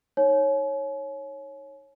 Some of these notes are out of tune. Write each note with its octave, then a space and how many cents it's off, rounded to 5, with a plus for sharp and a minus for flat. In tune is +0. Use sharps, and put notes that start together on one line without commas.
D#4 +0 C#5 -10 G#5 +40